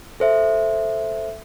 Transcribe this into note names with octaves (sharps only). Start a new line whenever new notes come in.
A4 C5 E5